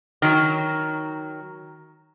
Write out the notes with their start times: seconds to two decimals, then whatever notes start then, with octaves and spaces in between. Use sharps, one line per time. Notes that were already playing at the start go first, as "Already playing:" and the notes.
0.22 D#3 F#3